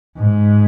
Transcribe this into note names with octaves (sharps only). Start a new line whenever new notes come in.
G#2